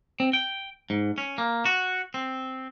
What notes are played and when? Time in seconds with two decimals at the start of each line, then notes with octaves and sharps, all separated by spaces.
0.20 C4
0.33 G5
0.90 G#2
1.18 C#4
1.38 A#3
1.65 F#4
2.14 C4